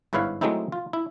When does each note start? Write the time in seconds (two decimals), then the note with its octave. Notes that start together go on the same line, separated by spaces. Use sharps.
0.13 G1 G#2 E4 B4 C#5 F5
0.41 F#3 G#3 A3 C4 D#4 E4
0.72 F4
0.93 E4